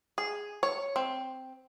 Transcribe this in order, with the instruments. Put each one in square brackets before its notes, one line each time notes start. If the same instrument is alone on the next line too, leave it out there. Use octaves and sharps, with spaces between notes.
[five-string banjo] G#4
C#5
C4